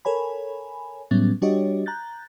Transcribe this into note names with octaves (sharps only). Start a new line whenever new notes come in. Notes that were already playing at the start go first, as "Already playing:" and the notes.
A4 A#4 C#5 G#5 B5
A2 F#3 G3 B3 C#4 A6
G3 D4 F#4 G4 C#5 D#5
A#5 F#6 G6 A6